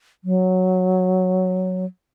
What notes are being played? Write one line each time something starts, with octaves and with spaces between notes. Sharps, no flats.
F#3